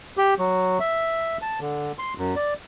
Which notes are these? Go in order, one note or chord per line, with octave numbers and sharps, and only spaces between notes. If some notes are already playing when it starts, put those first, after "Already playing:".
G4
F#3
E5
A5
D3
C6
F#2
D5